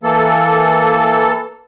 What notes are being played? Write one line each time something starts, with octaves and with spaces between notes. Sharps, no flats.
E3 A#3 A4